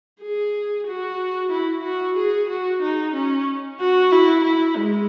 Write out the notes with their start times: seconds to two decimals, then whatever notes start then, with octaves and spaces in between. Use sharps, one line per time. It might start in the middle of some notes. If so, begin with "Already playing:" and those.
0.21 G#4
0.87 F#4
1.51 E4
1.83 F#4
2.17 G#4
2.49 F#4
2.82 D#4
3.14 C#4
3.80 F#4
4.12 E4
4.44 E4
4.77 G#3